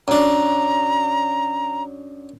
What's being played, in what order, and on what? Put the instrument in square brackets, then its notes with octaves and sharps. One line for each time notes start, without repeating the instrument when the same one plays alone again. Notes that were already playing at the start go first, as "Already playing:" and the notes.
[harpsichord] F#2 D4 [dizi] A#5